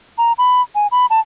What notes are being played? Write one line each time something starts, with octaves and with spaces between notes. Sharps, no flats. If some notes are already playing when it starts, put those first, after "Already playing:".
A#5
B5
G#5
B5
A5